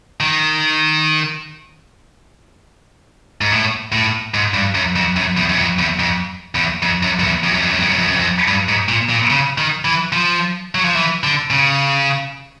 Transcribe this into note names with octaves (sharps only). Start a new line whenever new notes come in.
D#3
G#2
A2
A2
G#2
G2
F#2
F2
F#2
E2
F#2
F2
E2
F2
E2
F2
F#2
F2
E2
F2
F#2
F2
F#2
F2
F#2
F2
F#2
F2
G2
G#2
A#2
A#2
C#3
D#3
E3
F3
F#3
F3
E3
D3
C#3